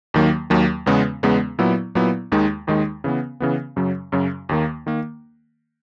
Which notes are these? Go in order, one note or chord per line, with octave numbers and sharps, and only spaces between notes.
D#2 D#3 F#3 A#3
D#2 D#3 F#3 A#3
E2 C#3 G#3 B3
E2 C#3 G#3 B3
A#2 F#3 B3 E4
A#2 F#3 B3 E4
D#2 D#3 G#3 D#4
D#2 D#3 G#3 D#4
C#3 E3 B3
C#3 E3 B3
F#2 C#3 F#3
F#2 C#3 F#3
D#2 D#3 A#3
D#3 A#3